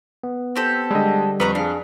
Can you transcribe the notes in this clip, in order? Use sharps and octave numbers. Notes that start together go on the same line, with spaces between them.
B3
C4 G4 A4
D3 G3 G#3 D#5
F2 B4 A#5 C#6
D4 G#4 F5